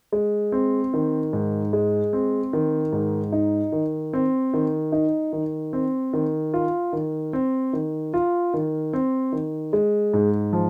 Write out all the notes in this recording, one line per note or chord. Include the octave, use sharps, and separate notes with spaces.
G#3
C4
D#3
G#2
G#3
C4
D#3
G#2
D#4
D#3
C4
D#3
D#4
D#3
C4
D#3
F4
D#3
C4
D#3
F4
D#3
C4
D#3
G#3
G#2
F3